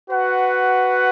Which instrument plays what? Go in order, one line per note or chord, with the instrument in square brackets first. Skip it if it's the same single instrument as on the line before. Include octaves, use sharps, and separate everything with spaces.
[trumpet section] F#4 B4 F#5